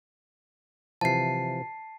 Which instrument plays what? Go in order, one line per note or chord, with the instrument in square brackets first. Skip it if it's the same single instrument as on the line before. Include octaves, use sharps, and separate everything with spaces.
[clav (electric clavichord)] C3 E3 F3 [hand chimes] A5 C7